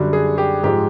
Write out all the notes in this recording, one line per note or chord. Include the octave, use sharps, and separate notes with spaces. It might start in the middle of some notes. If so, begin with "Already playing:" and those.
Already playing: F#2 D3 G3 F#4
G#4
G4
G#2 F3 G#3 G4